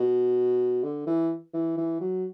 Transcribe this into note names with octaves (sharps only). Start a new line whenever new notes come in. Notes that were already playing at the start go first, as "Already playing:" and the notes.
Already playing: B2
D3
E3
E3
E3
F#3